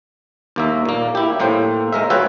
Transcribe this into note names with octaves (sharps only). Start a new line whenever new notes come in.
D#2 A#3 E5
A#2 A#3
E4 G4
A2 A#3 C5 G5
G#3 A#4 E5
F4 F#4 B4 C#5 E5 G5